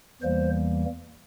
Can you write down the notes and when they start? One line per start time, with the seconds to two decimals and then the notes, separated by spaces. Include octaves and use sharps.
0.22 E2 E3 G3 A#3 C5